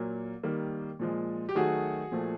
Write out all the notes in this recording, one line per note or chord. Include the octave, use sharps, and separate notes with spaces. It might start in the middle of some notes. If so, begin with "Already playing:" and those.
Already playing: A#2 F#3 A#3
D#3 G3 A#3
A#2 F3 G#3
G4
D#3 F#3 A3 F#4 G#4
A#2 F3 A3